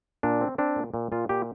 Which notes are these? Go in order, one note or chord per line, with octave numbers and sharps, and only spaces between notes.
A#2 D4
C4
C4 D4
A#2
A#2
A#2 F4
A#2 G4